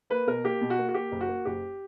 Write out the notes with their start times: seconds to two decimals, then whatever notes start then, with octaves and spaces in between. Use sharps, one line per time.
0.10 A#3 B4
0.27 B2 A#4
0.44 A#3 G4
0.61 B2
0.70 F#4
0.78 A#3
0.89 F#4
0.94 A#3 G4
1.12 F#1
1.21 F#4
1.28 A#3
1.45 F#1 G4